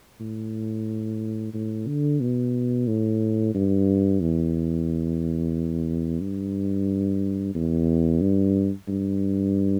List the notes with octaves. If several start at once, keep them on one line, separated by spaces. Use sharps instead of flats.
A2
A2
D3
B2
A2
G2
E2
G2
E2
G2
G2